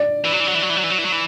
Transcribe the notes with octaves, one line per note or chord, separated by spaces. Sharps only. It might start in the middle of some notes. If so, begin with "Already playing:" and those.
Already playing: D5
E3
F#3
E3
F#3
E3
F#3
E3
F#3
E3
F#3
E3
F#3
E3